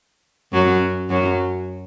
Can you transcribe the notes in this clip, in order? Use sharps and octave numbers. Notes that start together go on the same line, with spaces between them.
F#2 F#3
F#2 F#3